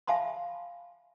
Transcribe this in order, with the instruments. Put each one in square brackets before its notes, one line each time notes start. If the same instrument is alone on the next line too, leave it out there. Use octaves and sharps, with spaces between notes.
[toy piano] E5 F5 G#5 A5 B5 C6